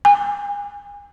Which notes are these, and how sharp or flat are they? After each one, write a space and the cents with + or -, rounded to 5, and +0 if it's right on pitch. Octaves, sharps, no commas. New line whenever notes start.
G#5 -30